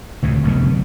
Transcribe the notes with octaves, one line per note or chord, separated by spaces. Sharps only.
D2 A2 C3
F1 B1 F2 D3